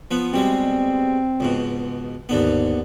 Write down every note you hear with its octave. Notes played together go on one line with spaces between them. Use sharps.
F3 B3
B2 G3 G#3 C4
C#2 G#2 B2
D#2 G#2 D3 B3